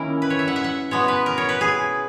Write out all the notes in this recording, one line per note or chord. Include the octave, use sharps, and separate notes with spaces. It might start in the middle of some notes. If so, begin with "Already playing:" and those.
Already playing: D#3 A#3 C#4 E4 A#4
B4
C#5
E5
F#5
E5
F#5
B2 G#3 B3 C#5
B4
A#4
C#5
B4
G#4